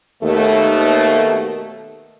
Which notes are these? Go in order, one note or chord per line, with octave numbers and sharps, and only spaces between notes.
D#2 B2 A3